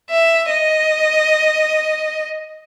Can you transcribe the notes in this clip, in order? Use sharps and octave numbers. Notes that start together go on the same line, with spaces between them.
E5
D#5